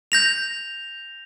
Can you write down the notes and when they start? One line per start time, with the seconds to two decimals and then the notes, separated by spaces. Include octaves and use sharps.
0.12 G6 A#6 F7